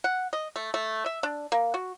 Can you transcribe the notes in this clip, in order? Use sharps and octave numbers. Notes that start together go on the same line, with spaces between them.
F#5
D#5
A3
A3
E5
D4
A#3
F#4